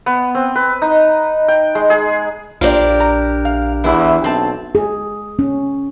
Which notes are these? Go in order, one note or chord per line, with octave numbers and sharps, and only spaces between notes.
B3
C4
B4
D#4
G5
G#3
G#4
A#1 D4 F4 G4 A#4 C5
A#5
F5
E2 E3 E4
B1 C4 A5
G#4
C#4